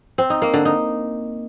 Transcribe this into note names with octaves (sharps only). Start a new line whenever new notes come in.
C4
D#4
A#3
D3
D#4